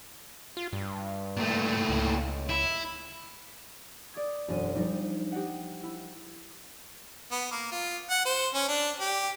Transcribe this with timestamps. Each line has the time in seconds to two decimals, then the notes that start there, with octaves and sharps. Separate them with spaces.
0.57 F4
0.73 G2
1.37 A#2 A3
1.89 C#2
2.49 E4
4.14 D5 D#6 G#6
4.48 E1 F#2 D4 G#4 D#7
4.75 F3 G3 D4 D#4
5.32 G4 D#5 F#5
5.83 E4
7.31 B3
7.51 A#3
7.72 F4
8.10 F#5
8.25 C5
8.54 C#4
8.68 D4
9.00 G4